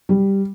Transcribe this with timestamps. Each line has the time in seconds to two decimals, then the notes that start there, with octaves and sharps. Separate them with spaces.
0.09 G3